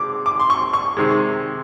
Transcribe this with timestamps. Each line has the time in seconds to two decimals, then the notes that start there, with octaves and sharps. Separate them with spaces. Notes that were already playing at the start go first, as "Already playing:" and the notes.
Already playing: C3 G#3 D6
0.26 D6
0.40 C6
0.50 C#6
0.73 C#6
0.97 C3 D#3 G#3